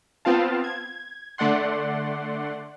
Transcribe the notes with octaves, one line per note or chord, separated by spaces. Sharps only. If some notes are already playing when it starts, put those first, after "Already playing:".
B3 C4 F4 F5 A5
G#6
D3 A3 D5 F#5 C6